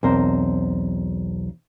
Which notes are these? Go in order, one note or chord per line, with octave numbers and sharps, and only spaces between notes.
B1 E2 C4 A#4 C5